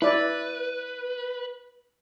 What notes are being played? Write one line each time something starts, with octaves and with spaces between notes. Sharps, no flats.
E4 B4 D5